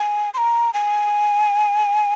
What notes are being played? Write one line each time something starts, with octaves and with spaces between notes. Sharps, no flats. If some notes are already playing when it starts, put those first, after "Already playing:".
Already playing: G#5
C6
A#5
G#5